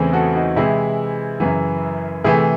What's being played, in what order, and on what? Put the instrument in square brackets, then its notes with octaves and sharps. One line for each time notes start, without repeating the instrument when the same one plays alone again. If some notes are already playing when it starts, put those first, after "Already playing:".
Already playing: [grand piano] E2 C#3 E3 A3 C4
F#4 A4
D#4 F#4
C3 E3 G#3 E4
F#2 C#3 E3
C3 E3 A3 E4 G#4